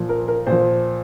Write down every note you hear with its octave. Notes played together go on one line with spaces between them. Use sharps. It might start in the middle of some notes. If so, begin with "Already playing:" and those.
Already playing: A#2 F3
A#4
A#4
A#2 F3 C5